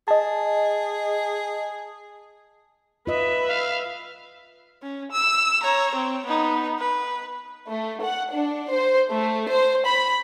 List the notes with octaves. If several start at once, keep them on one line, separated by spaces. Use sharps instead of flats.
G#4 D#5 A5
F4 B4 D#5 E5
F5
C#4
E6
C#5 A#5
C4
B3 D#4
B4
A3
F#5
D4
C5
A3
C5
B5